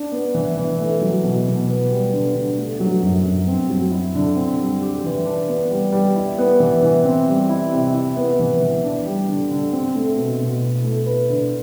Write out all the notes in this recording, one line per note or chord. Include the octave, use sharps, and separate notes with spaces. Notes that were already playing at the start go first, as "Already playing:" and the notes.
Already playing: D4
B3
E3
E3
A3
F#3
B2
B2
B3
G3
D3
D3
A3
F#3
F#2
F#2
C4
F#3
E4
D3
C4
G3
G4
E3
D4
B3
G3
G3
E4
B3
E3
E3
C4
G3
E4
C3
E4
B3
E3
E3
D4
G3
D3
D3
C4
A3
B2
B2
E4
A3
B4
D3